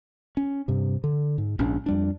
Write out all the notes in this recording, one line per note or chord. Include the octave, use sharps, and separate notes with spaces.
C#4
G2 C3
D3
G#2
A#1 G#2 C#4 D4
F2 G3 D4